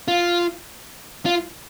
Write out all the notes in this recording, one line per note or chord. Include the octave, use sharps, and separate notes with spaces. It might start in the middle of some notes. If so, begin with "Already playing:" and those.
F4
F4